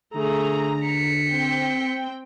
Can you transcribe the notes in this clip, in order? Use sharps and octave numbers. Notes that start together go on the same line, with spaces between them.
D3 A3 G#4 A#5
B6 C#7
C4 G5